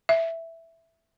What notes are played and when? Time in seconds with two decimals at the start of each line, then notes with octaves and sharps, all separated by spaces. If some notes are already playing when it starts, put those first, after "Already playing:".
0.09 E5